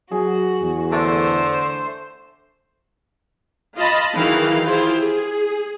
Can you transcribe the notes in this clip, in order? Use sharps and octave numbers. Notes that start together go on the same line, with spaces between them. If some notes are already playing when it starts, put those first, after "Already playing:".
F#3 F#4 G#4
E2
D3 A3 C5
F4 D#5 A5 B5
D#3 E3 F#3 G#4 F5
E4 F4 G4 G#4 C5
G#4